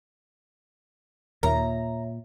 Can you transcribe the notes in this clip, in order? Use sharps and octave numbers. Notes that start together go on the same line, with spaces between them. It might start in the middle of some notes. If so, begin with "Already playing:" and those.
D#2 A#2 A#4 C#5 E5 A#5